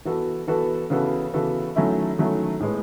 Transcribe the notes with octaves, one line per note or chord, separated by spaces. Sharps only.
E3 B3 F#4 A4
E3 B3 F#4 A4
C#3 E3 B3 F#4 A4
C#3 E3 B3 F#4 A4
D#3 F#3 A3 C#4 E4
D#3 F#3 A3 C#4 E4
A2 G#3 B3